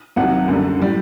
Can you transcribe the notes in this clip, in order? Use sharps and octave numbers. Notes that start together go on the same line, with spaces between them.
C2 C3 D#3 F#3 F#5
F#2 D3 G3
A2 G3